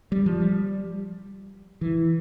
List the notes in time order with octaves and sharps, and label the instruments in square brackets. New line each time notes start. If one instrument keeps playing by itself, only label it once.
[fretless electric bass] G3
F3
G3
E3